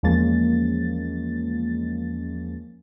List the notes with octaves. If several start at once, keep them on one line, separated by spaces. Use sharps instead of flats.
E2 F3 G#3 A#3 C#4 A6